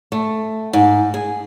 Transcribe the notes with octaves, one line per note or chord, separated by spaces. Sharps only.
A3
G#2
G#4